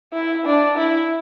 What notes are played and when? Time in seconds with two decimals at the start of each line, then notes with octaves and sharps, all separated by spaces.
0.13 E4
0.46 D4
0.77 E4